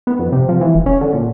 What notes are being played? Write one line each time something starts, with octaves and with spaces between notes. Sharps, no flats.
B3
F2
C3
F3
E3
E1
C#4
D3
A#2